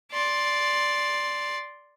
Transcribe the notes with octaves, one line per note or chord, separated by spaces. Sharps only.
D5 C6